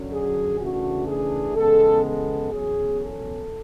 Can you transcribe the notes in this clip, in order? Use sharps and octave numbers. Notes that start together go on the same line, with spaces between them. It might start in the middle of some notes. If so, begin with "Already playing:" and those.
Already playing: F#2 D3 F#3
G#4
C#3 E3 A3 D4 F#4
G#4
E2 C#3 G#3 B3 A4
A4
E2 B2 F#3 C#4 G#4
A4